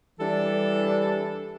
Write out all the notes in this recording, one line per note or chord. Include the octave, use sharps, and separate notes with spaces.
E3 G3 D4 A4